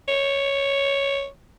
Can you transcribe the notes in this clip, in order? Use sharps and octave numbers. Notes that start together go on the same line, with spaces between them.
C#5